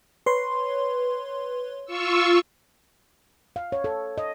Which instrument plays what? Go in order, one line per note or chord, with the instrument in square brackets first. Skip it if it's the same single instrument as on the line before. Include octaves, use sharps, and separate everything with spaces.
[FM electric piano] B4 C#5 C6
[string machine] F4 C#6 E6
[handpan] F5
C#5
A4
D#5